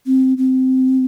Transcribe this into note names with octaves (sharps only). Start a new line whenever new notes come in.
C4
C4